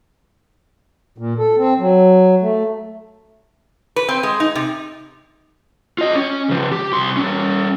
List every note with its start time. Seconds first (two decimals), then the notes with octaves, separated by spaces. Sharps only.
1.18 A#2
1.38 A4
1.58 C4
1.79 F#3
2.42 A3
3.96 B4
4.09 C4
4.23 G#3
4.40 D#4
4.55 C3
5.98 F4 D#5
6.15 C#4
6.49 C#3 F3
6.72 G4
6.93 C2 C6
7.17 G3 C#4